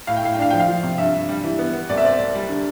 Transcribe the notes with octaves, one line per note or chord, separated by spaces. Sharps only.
A2 F5
G5
A2 F5
G5
D4 F5
F3 G5
F5
F3
C3
G2 E5
G2
G3
E3
B3
B3
C2 D5
E5
C4 D5
C2
G3
D3